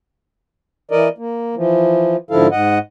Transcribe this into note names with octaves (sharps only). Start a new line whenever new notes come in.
E3 A#4 D5 D#5
A#3
E3 F3
G#2 D3 F3 E4 A4 F5
G#2 D#5 F#5